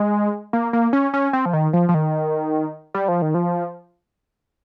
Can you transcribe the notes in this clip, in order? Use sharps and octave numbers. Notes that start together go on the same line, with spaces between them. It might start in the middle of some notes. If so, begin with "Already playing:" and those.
Already playing: G#3
A#3
A#3
C#4
C#4
C4
F3
D#3
F3
F3
D#3
G3
F3
D#3
F3